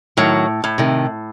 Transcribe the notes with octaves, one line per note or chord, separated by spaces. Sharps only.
A2 D#3 F#3
A2
C3 D#3